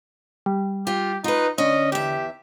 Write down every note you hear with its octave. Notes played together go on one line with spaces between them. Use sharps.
G3
F4 G4
D#4 F4 B4
D3 C#4 D#5
E2 G4 E5